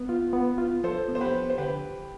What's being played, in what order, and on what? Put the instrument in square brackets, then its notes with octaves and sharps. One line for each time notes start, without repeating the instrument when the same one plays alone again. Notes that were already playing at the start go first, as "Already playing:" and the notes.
Already playing: [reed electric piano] B3 [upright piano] B4
[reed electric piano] F4
B3
F4
[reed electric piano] F3 [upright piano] A4 C5
[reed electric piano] B3
[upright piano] C5
G4 B4
[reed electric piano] F3
[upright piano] C5
[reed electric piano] D3 [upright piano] G4 B4